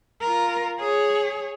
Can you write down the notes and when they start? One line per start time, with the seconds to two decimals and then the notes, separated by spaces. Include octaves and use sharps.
0.21 F4 A#4
0.80 G#4 C#5